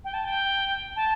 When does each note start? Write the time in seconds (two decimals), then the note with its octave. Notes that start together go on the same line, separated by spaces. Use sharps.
0.04 G5
0.14 A5
0.24 G5
0.96 A5